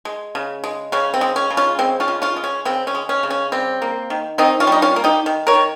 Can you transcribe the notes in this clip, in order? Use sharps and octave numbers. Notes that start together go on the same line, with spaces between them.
G#3
C#3
G#3
C#3 C#4
C4
G#3
C#4
C#3
C#4 F4
G#3 C4
C#4 F4
C#3
C#4 F4
G#3
C#4
C#3 C4
C#4
G#3
C#4
C#3
C#4
G3 C4
A#3
D#3
D#3 C4 D#4
C#4 F4
G3 D#4
C#4 F4
A#3
D#4 G4
D#3
A#4 C#5
D#3